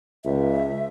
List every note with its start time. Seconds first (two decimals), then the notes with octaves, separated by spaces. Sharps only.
0.25 C#2 E5